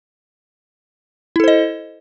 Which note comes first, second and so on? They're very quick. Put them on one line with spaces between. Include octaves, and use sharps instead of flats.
E4 A4 C5 D#5